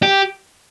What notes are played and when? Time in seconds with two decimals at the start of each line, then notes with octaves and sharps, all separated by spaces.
0.03 G4